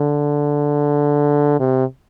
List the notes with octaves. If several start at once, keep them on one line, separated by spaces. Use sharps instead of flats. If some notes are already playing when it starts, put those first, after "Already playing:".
Already playing: D3
C3